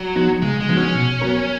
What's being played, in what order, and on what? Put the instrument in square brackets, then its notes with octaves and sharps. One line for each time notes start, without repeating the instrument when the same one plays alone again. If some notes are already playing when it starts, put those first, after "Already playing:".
Already playing: [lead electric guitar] F#3
[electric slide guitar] F3 B3 D#4 F#4
[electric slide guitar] C#3 [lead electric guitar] G#3
[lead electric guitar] G#3
[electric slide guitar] F3 B3 D#4 F#4
[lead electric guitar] C#4
[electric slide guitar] B2
F#3 B3 F#4 A#4